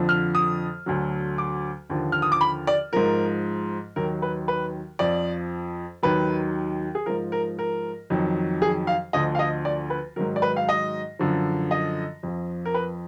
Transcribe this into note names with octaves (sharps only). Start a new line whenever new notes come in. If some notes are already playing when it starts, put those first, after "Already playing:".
Already playing: F2 D3 F3
F6
D#6
D2 D3 F#3
D6
D#2 D3 F3
F6
D#6
D6
B5
D5
G#2 F3 A#4
D#2 D#3 F#3 A#4
B4
B4
F2 F3 D5
D#2 D#3 F#3 B4
G#4
G#2 F3 A#4
A#4
A#4
F2 D#3 F#3
G#4
F5
D2 D3 F3 D#5
F5
D#5
D5
B4
G#2 D#3 F#3 A#4
D5
B4
F5
D#5
F#2 D3 F3
D#5
F2 F3
A#4
B4